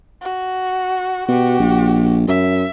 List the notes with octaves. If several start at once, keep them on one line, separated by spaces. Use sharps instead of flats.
F#4
B2 F#4 G4
A#1
F#2 E5